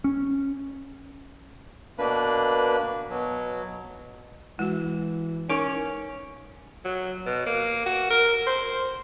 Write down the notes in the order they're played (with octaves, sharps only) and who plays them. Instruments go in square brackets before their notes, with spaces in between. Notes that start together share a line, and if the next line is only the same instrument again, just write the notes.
[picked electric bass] C#4
[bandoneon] B2 A#3 D4 B4
B2 F#3
[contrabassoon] E3 [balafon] G#3 F#4
[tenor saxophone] C#4 [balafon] D#4 A#4 D6
[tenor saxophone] F#3
B2
A#3
F#4
A#4
C5